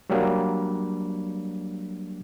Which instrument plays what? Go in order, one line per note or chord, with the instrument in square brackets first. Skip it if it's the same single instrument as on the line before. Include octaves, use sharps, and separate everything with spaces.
[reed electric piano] F#3 G3 A#3 D4